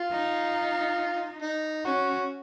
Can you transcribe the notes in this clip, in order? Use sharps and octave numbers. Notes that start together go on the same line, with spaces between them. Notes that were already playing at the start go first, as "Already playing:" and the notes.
Already playing: F4
D#4
D#4
C#4 F#4